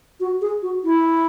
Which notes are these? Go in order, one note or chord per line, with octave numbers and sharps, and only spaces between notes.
F#4
G#4
F#4
E4